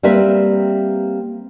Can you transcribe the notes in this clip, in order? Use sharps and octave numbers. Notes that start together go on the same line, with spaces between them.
G3 A#3 C4 B4 E5